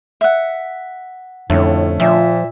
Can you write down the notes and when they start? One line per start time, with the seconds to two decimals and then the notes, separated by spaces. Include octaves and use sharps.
0.21 E5 F#5
1.50 F2 A2 D3 A3 C#4
2.00 A#2 F3 E5